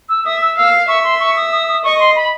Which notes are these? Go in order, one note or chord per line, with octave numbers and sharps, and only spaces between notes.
E6
E5 D#6
E6
F5 E6
E5 C#6
C6
C#6
D#6
D#6
D#6
D#5 C#6
C6
B5